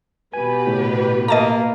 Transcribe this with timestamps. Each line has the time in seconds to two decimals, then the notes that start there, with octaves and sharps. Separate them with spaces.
0.34 B2 G4 B4 G#5
0.67 A2 C#3
1.28 A#3 D#5 A5 A#5